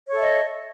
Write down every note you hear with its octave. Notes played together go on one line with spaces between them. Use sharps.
A4 C#5 D#5 E5